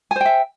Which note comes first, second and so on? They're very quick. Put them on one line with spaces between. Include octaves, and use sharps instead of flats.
G#5 C5 G5 E5